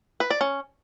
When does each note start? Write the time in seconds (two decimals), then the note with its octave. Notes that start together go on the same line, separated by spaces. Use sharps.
0.20 B4
0.30 D5
0.41 C#4